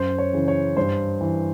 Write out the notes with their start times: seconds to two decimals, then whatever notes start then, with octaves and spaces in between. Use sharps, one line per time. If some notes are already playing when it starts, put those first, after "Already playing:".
Already playing: F#2 C5
0.18 C#5
0.33 C#3 E3
0.48 C#5
0.77 G2 C5
1.21 E3